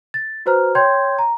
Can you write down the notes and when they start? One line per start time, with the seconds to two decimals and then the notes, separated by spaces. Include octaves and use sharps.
0.14 A6
0.46 F#4 B4 C5 A#5 F6
0.75 C#5 G5 C6 G6 G#6
1.19 A#5